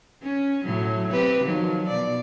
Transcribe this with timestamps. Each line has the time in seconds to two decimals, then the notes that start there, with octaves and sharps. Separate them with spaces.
0.23 C#4
0.65 A2 F#3
1.11 C4 G4 B4
1.44 D#3 F3 F#3
1.88 B2 D5